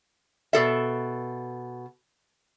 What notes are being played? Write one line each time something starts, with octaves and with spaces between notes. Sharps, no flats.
B2 G#4 A4 E5